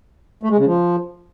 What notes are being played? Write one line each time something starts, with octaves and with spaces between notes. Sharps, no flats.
A3
G#3
C#3
F3